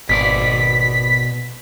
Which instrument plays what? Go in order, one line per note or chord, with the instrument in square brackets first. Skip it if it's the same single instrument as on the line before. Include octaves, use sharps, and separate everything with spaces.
[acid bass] G#1 [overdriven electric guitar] B2 D5 [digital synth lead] B6